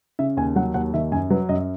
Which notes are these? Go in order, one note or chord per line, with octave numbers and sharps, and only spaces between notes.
C#3 E5
D#2 G#5
F#3 F#5
D#2 F#5
D#3 E5
F#2 G#5
F#3 B4
F#2 D#5